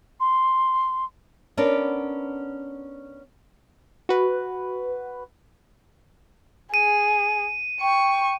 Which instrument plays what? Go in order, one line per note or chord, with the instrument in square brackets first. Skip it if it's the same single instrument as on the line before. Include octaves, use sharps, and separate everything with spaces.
[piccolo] C6
[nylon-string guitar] B3 C#4 D4 A#4 D5
[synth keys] F#4 B4
[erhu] G#4 [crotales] D#7
[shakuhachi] G5 [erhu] C#6